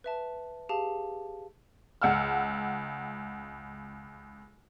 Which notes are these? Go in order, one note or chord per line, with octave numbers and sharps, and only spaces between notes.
B4 E5 A5
G4 G#4 F5 A5
C#2 F#5 E6 F6